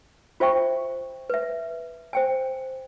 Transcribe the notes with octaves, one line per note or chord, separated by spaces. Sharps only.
F4 C5 E5 G5 C#6
B4 E5
C5 G5 G#5